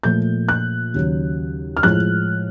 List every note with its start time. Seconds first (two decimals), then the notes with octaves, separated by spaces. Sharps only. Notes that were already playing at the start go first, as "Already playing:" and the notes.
0.03 A#2 F3 A3 G6
0.49 F#6
0.94 D#2 C#3 F#3
1.77 F6
1.83 A2 F3 G#3 F#6